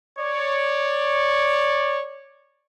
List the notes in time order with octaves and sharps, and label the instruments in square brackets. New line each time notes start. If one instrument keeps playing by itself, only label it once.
[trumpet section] C#5 D5